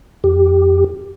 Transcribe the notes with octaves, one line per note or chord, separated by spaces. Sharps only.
F2 G4